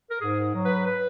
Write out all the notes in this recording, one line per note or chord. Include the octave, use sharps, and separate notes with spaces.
A#4
G#2 G#4
F#3
B4
B4